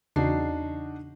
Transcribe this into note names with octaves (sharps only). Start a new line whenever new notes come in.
E2 C#3 D4 D#4 F#4 C7